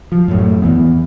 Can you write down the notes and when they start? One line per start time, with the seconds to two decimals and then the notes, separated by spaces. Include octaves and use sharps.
0.12 F3
0.28 F#2 A2
0.62 E2 E3 B3